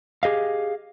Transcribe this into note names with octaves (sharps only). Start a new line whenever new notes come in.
G4 G#4 D#5 F5